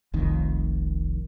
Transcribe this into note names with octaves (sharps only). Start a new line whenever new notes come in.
F1 C2 F2 D#3